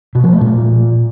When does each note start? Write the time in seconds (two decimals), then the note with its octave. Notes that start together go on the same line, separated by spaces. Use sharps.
0.15 B2
0.24 F3
0.32 A3
0.41 A#2